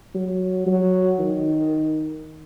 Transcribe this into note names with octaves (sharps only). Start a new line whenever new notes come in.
F#3
F#3
D#3